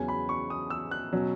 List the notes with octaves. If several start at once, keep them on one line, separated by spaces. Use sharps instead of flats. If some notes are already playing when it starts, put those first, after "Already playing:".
Already playing: E2 C#3 F#3 C#4 G#5
B5
C#6
D#6
E6
F#6
B2 F#3 C#4